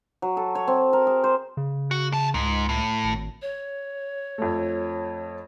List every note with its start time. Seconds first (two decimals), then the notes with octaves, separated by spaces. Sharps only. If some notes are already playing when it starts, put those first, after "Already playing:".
0.22 F#3
0.37 A4
0.55 C#5
0.67 C4
0.93 A#4
1.07 G#4
1.24 C5
1.57 C#3
1.91 F#4
2.12 E2 A5
2.34 C#2 G#2
2.69 A2
3.04 G#1
3.42 C#5
4.38 F2 A3